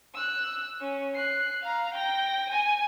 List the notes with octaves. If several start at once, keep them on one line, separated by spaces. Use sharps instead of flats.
E6 F#6
C#4
F#6 C7
F5 A#5
G5 A#6
G#5